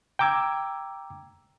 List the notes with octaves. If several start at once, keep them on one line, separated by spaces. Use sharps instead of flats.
G5 A#5 D6 E6 G#6